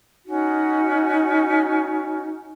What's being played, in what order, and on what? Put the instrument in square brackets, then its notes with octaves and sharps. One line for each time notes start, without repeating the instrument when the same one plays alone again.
[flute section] C#4 D#4 F#4